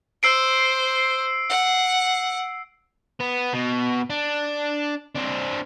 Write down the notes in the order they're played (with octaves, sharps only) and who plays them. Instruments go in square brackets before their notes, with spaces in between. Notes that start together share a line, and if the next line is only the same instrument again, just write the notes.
[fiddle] C5 [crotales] E6 C7 D7
[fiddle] F#5
[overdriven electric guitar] B3
B2
D4
C4 D4